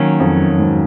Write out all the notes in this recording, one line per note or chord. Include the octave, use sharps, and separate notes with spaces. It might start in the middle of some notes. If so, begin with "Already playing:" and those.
Already playing: D#3 F#3 A#3 C#4
F2
F#2
G#2